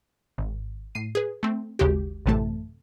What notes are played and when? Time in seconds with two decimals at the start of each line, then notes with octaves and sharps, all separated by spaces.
0.38 G#1
0.95 A2 C7 D#7
1.15 G#4 B4
1.43 A3 C4
1.79 G#1 D#2 C#3 G#3 F#4 G4
2.26 A1 F#2 C3 E3 A3 A5